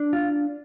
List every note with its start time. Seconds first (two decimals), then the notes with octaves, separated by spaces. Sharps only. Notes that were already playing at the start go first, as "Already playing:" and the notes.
Already playing: D4
0.13 F4